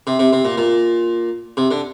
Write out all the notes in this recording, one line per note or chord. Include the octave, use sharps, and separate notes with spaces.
C3
C3
C3
A#2
A#2
C3
D3